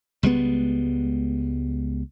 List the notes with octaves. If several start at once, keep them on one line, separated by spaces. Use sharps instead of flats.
C#2 G3 G#3 B3